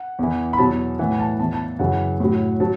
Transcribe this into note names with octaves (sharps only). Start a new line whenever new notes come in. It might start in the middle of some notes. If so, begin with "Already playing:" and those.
Already playing: F#5
E2 E3
B5
E2 B2 F#3 A5
A2 E3 F#5
A5
E2 E3 A5
A5
F#2 C#3 E3 F#5
A2 F#3
F#3 A5